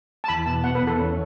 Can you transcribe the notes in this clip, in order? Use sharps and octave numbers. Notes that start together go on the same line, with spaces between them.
A5
E2 B5
B2 A5
B3 F#5
B4
E2
A4
C#4